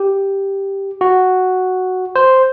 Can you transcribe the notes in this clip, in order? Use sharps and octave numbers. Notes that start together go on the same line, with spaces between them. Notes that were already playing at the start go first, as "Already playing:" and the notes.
Already playing: G4
F#4
C5